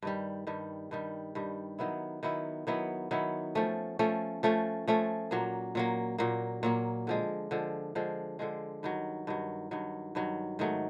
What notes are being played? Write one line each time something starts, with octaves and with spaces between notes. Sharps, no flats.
G2 D#3 G3
G2 D#3 G3
G2 D#3 G3
G2 D#3 G3
D#3 F#3 B3 E4
D#3 F#3 B3 E4
D#3 F#3 B3 E4
D#3 F#3 B3 E4
F3 A3 C#4
F3 A3 C#4
F3 A3 C#4
F3 A3 C#4
A#2 F#3 A#3
A#2 F#3 A#3
A#2 F#3 A#3
A#2 F#3 A#3
D3 F3 G#3
D3 F3 G#3
D3 F3 G#3
D3 F3 G#3
G2 D#3 F#3
G2 D#3 F#3
G2 D#3 F#3
G2 D#3 F#3
G#2 D#3 F#3 A3